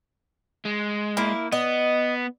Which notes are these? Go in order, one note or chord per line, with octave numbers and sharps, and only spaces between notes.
G#3
A#3 E4
B3 D#5